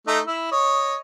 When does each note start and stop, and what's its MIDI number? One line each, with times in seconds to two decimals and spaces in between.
0.07 0.20 57
0.07 0.20 63
0.07 0.20 88
0.27 0.47 64
0.27 0.47 88
0.52 0.96 73
0.52 0.96 75